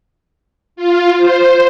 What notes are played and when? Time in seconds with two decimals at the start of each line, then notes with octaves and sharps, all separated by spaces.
0.76 F4
1.17 C5